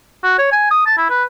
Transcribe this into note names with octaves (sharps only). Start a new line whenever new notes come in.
F#4
C#5
G#5
D#6
A5
E4
B4